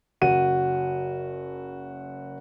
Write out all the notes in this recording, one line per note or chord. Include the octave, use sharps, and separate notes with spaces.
F#1 F#4 D#7